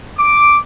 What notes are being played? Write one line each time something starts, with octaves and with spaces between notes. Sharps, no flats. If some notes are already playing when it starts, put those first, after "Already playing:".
D6